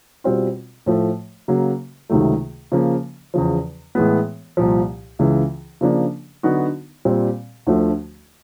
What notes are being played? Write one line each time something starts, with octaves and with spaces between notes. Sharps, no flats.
B2 G3 C4 F4
A2 F3 A3
C#3 F#3 A#3
C#2 C3 D#3 F#3 A3
C#3 F3 A#3
E2 C#3 F3
A2 E3 G#3 B3
C2 A#2 F3
C#2 C#3 E3
C#3 F3 A#3 D4
D3 F#3 B3 D#4 F#4
A#2 G3 C4
D2 D3 F3 A3